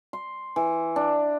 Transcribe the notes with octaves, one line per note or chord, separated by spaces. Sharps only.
C6
E3
D4